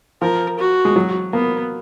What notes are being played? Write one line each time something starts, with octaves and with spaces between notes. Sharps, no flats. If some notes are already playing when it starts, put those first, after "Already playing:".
F3 A#4
F#4
G#3
F#3
A#3 B3